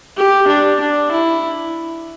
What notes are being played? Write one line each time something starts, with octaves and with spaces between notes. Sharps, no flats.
G4
D4
D4
E4